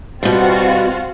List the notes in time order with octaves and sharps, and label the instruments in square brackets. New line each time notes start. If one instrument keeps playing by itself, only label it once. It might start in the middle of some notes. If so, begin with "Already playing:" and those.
[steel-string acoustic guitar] B2 G3 [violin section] C4 F4 F#4